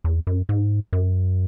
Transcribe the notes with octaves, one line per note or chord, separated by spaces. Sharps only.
E2
F#2
G#2
F#2